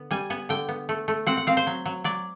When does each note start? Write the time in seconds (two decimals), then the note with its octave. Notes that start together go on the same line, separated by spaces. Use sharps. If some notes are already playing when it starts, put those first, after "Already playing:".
Already playing: D3 B3
0.11 G3 G#5
0.30 B3 G#5
0.49 D3 G5
0.69 B3
0.89 A3
1.08 A3
1.27 C4 F#5
1.37 F#5
1.47 C4 F5
1.57 C5
1.67 F#3
1.86 F#3
2.04 F#3 D5